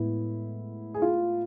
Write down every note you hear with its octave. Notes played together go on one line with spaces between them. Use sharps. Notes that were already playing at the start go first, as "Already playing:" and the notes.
Already playing: A2 G#3 B3 E4
G#4
F4